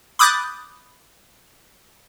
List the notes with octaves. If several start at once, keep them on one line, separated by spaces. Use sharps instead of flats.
B5 D6 D#6 F#6 G6 A6